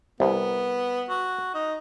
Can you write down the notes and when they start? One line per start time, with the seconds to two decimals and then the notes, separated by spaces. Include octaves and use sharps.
0.20 C2 B3
1.09 F#4
1.54 D#4